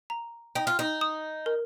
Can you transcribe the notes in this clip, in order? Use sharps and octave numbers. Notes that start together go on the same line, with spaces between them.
A#5
D#4 G5
F4
D#4
D#6
A#4